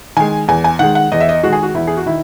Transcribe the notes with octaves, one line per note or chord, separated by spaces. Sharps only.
D#3 G#3 G#5
E2 G#5
G#5
D#3 G#3 F#5
F#5
E2 D#5
E5
D#5
D#3 G#3 F#4
G#4
F#4
E2 E4
G#4
F#4
D#3 E4